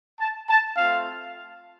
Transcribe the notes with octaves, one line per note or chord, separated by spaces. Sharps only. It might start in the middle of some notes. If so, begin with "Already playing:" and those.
A5
A5
A3 C4 F4 F5